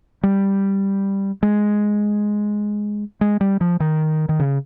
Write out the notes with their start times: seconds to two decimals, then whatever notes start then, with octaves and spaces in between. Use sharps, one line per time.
0.23 G3
1.43 G#3
3.21 G#3
3.41 G3
3.61 F3
3.80 D#3
4.29 D#3
4.39 C#3